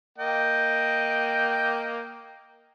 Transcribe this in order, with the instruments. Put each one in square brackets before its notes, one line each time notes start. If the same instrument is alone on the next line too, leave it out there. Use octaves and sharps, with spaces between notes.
[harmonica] A#3 D#5 G5